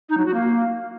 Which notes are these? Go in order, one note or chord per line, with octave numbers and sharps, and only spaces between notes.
D#4
F#3
F#4
A#3